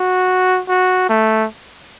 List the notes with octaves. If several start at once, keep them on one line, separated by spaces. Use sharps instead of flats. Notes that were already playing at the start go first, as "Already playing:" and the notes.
Already playing: F#4
F#4
A3